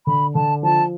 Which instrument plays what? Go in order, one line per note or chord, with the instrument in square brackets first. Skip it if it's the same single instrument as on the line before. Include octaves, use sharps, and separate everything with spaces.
[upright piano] D3 [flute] B5
[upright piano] D3 [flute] A5
[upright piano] F3 [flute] A5